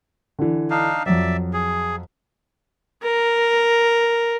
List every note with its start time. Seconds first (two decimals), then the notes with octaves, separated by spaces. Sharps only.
0.39 D3 E3
0.70 D4 D#4 F5
1.06 F2 F#3 D5 E5
1.53 G#4
3.03 A#4